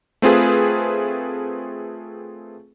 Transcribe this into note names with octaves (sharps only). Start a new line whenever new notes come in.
A3 C4 F4 G#4 B4